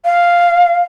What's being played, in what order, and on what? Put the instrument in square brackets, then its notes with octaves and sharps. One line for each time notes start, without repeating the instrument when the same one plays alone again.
[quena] F5